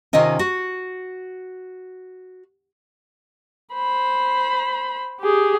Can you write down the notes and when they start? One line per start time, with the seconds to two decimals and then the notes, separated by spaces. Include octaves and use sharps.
0.13 C3 D#3 C#4 F4 D#5 G#5
0.39 F#4
3.74 C5 B5
5.20 G4 G#4